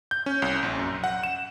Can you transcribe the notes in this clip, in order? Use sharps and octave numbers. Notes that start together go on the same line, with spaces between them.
G6
C#4
C2
A#1
F#2
F#5
E7